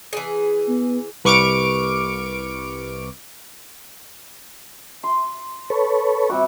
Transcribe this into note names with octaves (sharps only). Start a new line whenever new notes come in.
E3 G#4
B3
C2 B4 C#6 D6 F6 D7
C6
A4 B4 C#5
C3 G3 F#4